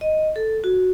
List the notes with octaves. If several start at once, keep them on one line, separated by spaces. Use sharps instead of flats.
D#5
A4
F#4